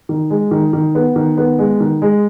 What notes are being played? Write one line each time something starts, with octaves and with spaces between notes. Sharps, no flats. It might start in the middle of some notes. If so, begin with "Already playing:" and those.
D#3
G#3
D#3
D#3
B3
D#3
B3
G#3
D#3
G#3